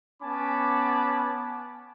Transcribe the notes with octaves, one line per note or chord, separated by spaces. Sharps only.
B3 C#4 G#5 A5 B5 D6